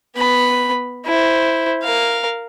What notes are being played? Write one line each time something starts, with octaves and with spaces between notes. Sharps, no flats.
B3 B5
E4 C5
A#4 F5